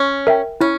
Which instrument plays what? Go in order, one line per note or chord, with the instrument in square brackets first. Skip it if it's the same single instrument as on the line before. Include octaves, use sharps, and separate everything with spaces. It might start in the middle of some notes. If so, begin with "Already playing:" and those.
Already playing: [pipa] C#4
[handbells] A#4 E5 G5
[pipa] C#4 [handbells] E4